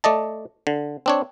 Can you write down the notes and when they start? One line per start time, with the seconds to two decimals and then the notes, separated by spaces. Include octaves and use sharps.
0.04 A3 D5 D#5 A5
0.67 D3
1.06 C4 D4 C#5